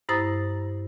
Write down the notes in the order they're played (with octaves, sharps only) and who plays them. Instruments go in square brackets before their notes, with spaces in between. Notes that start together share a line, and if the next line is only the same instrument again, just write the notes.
[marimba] G2 E4 C5 A#5 D#6 A6